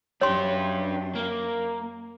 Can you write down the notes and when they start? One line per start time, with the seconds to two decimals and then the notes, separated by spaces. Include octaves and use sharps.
0.21 F#2 F#3 D4 G4 C#5 C6
1.15 A#3